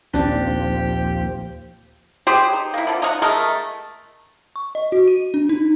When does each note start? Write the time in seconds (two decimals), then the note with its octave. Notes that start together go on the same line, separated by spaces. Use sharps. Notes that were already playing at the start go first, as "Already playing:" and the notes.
0.14 A#1 D#2 D#3 F3 C4 D4 G4
2.27 G4 G#4 B4 C5
2.53 D#4
2.74 A#3 E4
2.87 D3 F3
3.02 D#4 A#4 F#5
3.22 G#3 A3 A#4 D#5
4.56 C#6
4.75 D#5
4.92 F#4
5.08 D#7
5.34 D4
5.49 D#4